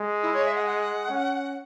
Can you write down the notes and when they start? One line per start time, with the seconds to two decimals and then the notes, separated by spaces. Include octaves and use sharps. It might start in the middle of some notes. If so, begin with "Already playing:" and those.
Already playing: G#3
0.23 E4
0.34 C#5
0.45 E5
0.55 F#5
0.66 F#5
1.09 C#4